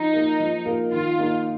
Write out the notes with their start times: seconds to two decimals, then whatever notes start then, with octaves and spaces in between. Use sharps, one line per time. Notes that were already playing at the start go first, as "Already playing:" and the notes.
Already playing: F3 D#4
0.13 A#3 F4 A#4
0.40 F3
0.65 A#3 F4 A#4
0.92 D#3 F4
1.19 A#3 D#4 A#4